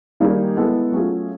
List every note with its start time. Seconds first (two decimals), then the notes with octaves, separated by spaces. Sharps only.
0.20 D#3 G3 A#3 D#4 G#4
0.57 G#3 B3 E4 A4
0.92 F#3 A3 C#4 F4 G#4